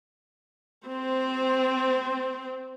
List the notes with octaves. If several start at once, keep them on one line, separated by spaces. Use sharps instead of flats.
C4 C5